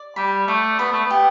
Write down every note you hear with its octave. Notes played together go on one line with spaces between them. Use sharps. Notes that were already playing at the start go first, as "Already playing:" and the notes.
Already playing: D5
G3 B5
A3 D5
B3 B5
A3
B3 G4